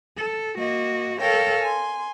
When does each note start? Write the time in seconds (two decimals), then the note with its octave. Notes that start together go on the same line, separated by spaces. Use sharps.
0.16 A4
0.57 A#3 F#4 D#5
1.19 A4 A#4 C#5 F5 G5
1.60 G#5 C6